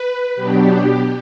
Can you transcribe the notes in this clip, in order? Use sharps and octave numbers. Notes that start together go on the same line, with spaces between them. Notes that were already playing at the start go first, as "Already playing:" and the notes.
Already playing: B4
B2 F#3 B3 D4 G4